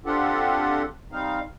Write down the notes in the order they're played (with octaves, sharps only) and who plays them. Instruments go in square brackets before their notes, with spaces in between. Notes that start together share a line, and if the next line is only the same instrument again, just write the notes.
[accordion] C4 D4 F4 G4 A4 F#5
G3 C4 D#4 F5